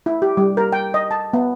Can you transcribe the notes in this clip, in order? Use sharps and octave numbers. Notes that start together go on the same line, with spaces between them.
E4
G4
G3
A#4
G5
D#5
A5
B3